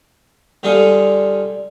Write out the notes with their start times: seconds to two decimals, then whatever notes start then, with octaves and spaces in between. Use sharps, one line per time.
0.63 D3 G3 D4 F4 G#4 A4